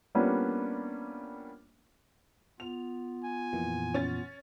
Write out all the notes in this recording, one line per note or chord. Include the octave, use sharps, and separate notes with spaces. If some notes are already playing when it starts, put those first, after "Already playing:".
G3 A#3 B3 C#4 D4 F4
B3 F4 F7
G#5
F2 A#2 E3
C#4 A6